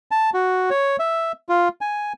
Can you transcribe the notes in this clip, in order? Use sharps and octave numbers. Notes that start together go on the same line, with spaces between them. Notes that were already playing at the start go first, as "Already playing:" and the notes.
A5
F#4
C#5
E5
F4
G#5